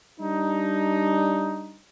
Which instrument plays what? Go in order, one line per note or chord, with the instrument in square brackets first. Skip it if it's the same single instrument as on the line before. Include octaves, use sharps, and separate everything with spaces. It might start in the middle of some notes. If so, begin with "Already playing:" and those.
[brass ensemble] G3 D4 D#4